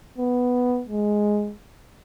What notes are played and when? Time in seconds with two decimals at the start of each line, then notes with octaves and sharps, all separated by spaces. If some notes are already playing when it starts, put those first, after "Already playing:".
0.18 B3
0.89 G#3